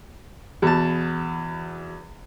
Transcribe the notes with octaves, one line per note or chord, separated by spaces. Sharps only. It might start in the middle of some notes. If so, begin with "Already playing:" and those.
E2 B2 A5